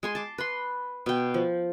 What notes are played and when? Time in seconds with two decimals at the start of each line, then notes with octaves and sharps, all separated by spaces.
0.03 G#3 G#5 C6
0.15 A5 D6
0.38 B4 B5 C6
1.06 B2 G5
1.34 F3